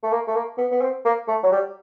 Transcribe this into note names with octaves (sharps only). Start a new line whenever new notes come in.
A3
A#3
A3
A#3
B3
B3
C4
A#3
A3
F#3
G3